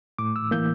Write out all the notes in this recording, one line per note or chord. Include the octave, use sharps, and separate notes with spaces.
A2 D6
E6
E3 A#3 G6